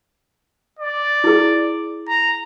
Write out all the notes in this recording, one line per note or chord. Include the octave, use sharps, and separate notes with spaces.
D5
E4 G#4
A#5